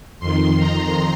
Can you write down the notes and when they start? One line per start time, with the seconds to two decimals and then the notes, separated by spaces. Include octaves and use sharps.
0.20 F2 D#3 C6
0.58 A#5